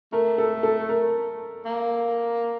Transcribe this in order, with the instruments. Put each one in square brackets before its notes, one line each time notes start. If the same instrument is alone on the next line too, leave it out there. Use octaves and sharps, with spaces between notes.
[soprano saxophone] A3 [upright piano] A#4
[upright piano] A4
A4
A#4
[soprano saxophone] A#3